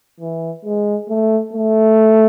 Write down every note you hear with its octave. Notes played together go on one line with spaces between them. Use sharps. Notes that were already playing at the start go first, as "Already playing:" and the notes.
E3
G#3
A3
A3